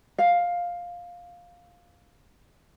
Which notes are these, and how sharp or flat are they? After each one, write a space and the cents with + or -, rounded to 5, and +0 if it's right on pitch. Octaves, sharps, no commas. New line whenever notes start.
F5 +10